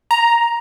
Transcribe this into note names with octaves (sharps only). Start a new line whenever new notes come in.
A#5